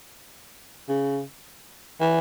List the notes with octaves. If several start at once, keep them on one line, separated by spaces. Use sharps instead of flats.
C#3
E3